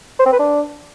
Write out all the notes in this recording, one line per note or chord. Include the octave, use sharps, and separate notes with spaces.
C5
C4
B4
D4